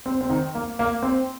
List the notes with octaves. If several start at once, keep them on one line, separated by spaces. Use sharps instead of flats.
C4
C4
D#3 D#4
A#3
A#3
C4